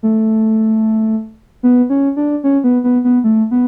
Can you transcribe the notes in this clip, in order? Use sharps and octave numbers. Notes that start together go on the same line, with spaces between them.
A3
B3
C#4
D4
C#4
B3
B3
B3
A3
B3